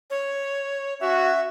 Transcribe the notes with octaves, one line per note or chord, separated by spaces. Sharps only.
C#5
C#4 F#4 E5